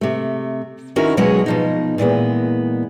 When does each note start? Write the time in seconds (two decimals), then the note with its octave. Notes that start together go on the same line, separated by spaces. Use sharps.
0.01 C3 A3
0.96 D#3 C4 C#4 E4 F#4 A#4
1.17 B2 F#3 G#3 C#4 G#4 C#5
1.46 B2 F3 D#4
1.98 A#2 E3 G#3 B3